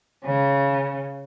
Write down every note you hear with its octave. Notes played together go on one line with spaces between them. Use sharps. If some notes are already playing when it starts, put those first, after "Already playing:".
C#3